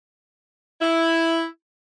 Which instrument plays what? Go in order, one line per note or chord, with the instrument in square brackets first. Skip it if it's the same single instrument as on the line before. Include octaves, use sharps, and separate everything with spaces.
[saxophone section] E4